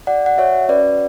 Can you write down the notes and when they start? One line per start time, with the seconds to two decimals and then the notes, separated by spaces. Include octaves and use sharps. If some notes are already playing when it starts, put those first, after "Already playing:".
0.07 F#4 D5 F#5
0.26 F#5
0.38 F#4 C#5 E5
0.69 C#4 B4 D5